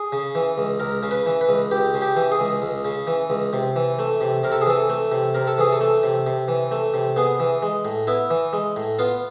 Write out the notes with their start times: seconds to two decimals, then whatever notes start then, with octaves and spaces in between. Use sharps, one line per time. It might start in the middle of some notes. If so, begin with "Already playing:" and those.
Already playing: G#4
0.12 C#3
0.35 E3
0.58 C#2
0.80 C#2 A#4
1.03 C#3
1.11 B4
1.26 E3
1.41 B4
1.49 C#2
1.71 C#2 G4
1.94 C#3
2.02 G4
2.16 E3
2.32 G#4
2.40 C#2
2.62 C#2
2.85 C#3
3.07 E3
3.30 C#2
3.53 C3
3.76 E3
3.99 A3
4.21 C3
4.43 C3 A#4
4.52 A4
4.61 G#4
4.66 E3 A4
4.90 A3
5.12 C3
5.35 C3 A#4
5.47 A4
5.58 E3 G#4
5.72 A4
5.81 A3
6.03 C3
6.27 C3
6.48 E3
6.71 A3
6.94 C3
7.16 B3 G#4
7.40 E3
7.62 G#3
7.85 A2
8.07 B3 E4
8.30 E3
8.53 G#3
8.76 A2
8.99 B3 F4